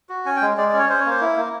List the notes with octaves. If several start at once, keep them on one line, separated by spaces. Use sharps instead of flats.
F#4
C#4 G#5
G5
G#3
G#3 D5
D5
C#4
C#5
C#4 C5
C#5
A#3 C5
E4
A#3